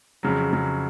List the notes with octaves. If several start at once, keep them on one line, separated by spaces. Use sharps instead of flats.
F2 C#3 F#3
F2 C#3 F#3